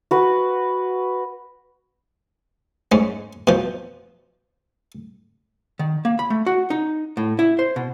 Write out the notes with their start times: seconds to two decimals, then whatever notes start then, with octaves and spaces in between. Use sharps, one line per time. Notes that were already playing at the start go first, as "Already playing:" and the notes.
0.11 F#4 B4
2.92 G#2 C#4
3.47 B2 F3
5.79 D#3
6.05 A#3
6.19 B5
6.30 A3
6.46 F#4
6.70 D#4
7.17 A2
7.39 E4
7.59 C5
7.76 B2